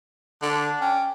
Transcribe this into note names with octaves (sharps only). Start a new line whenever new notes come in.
D3 D4
C#4 G5